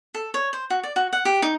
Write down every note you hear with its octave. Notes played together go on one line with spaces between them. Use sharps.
A4
C#5
C5
F#4
D5
F#4
F#5
G4
D#4